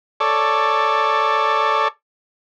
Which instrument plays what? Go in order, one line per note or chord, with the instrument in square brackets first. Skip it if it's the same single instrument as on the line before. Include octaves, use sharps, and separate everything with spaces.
[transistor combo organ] A4 C#5 D5